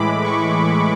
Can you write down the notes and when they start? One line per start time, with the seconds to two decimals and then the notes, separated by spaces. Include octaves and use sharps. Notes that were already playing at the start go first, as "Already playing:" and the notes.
Already playing: A2 E3 G#3 B5 D6
0.23 C#6